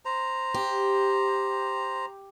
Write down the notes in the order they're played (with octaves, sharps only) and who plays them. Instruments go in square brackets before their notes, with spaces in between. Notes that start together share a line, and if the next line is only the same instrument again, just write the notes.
[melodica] C5 A#5
[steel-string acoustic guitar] G4